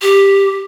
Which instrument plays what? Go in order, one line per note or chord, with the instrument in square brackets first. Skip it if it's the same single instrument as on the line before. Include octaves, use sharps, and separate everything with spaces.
[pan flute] G4